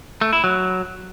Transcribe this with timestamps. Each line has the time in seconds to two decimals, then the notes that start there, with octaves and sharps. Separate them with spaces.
0.21 A3
0.33 E4
0.44 F#3